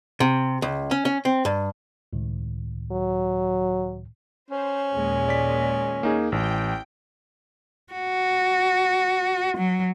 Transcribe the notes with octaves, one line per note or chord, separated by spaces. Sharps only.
C3
C#2
C#4
C#4
C4
G2
C#2 A2 D#3
F#3
C#4 C5
D#2 A#2 G#3
D5 B6
A#3 D#4 G#4
A1 G5
F#4
F#3